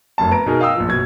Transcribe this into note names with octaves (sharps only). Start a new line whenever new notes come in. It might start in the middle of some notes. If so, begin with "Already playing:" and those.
F1 F#2 A5
B3 A#5 D7
B2 D#4 G#4 A#4
D#5 F5 G5 D#6 E6
A#1 F3
F#1 B2 G#6